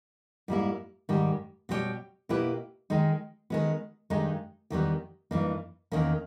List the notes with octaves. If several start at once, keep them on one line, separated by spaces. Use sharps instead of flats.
G#2 G3 A#3 E4
G#2 D#3 G3
B2 G3 B3 G4 C#5
B2 A#3 E4 G4 B4
D#3 G#3 D#4
D#3 G#3 B3
G2 D#3 G#3 D#4
E2 D#3 G3 B3
G2 E3 A#3 D#4
E2 D#3 A#3 C#4